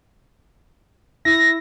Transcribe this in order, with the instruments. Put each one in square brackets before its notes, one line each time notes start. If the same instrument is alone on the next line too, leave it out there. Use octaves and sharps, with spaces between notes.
[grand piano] E4 [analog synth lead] A#6